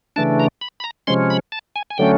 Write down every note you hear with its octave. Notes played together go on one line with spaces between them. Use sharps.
C#3 E3 A3 D4 A5
A#5
B5
B5
A#5
C3 F3 G#3 C#4 C6
B5
A5
G#5
G#5
D3 F#3 A3 C#4 G5